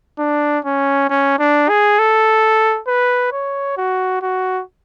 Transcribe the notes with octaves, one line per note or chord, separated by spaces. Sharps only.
D4
C#4
C#4
D4
G#4
A4
B4
C#5
F#4
F#4